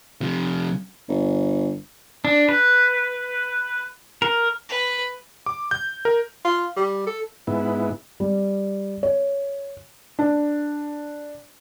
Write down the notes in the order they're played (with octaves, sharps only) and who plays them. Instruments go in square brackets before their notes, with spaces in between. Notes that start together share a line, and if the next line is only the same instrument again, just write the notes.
[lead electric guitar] C3 F3
[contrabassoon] G1
[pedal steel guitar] D4
B4
A#4
[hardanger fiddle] B4
[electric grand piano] D6
G6
A#4
[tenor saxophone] F4
G3
A4
[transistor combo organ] G#2 B3 E4
[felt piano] G3
C#5
D4